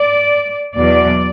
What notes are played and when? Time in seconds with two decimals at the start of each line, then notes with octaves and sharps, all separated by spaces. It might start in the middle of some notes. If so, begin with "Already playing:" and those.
Already playing: D5
0.77 E2 B2 F#3 D5